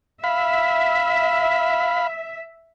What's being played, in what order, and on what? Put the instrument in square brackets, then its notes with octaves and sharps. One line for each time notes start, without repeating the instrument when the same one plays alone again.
[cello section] E5 [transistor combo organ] F5 B5